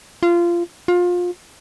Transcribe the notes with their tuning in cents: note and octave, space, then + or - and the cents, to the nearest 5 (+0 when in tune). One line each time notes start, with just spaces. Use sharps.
F4 -20
F4 +25